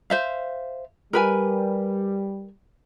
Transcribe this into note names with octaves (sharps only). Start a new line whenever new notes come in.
C5 E5 F5
G3 A#4 B4 G#5